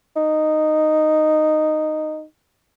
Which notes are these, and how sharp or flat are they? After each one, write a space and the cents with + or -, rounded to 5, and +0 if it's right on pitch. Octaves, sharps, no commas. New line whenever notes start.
D#4 -10